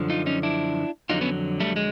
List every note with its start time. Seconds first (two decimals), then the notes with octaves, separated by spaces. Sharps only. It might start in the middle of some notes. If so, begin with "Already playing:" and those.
Already playing: F#2 D3 F3
0.10 D#4 F4
0.26 C#4 D#4
0.43 D4 E4
1.10 F2 D3 F#3 D#4 F4
1.21 B3 C#4
1.60 G3 A3
1.76 G#3